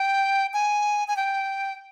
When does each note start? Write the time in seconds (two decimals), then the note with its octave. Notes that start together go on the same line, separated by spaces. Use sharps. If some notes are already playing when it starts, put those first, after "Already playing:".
Already playing: G5
0.54 G#5
1.08 G#5
1.17 G5